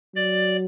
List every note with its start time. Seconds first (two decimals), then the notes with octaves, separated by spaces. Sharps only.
0.15 F#3 D5